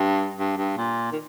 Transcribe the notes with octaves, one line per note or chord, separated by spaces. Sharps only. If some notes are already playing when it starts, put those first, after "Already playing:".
Already playing: G2
G2
G2
A#2
D#3